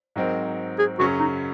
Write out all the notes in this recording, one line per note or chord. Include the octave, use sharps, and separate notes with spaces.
G#2 F#3 C4 D#4 A#4
G#4
F#2 C#3 F#3 C#4 F#4
D#4